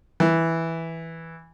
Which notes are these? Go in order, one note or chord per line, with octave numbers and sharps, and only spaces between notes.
E3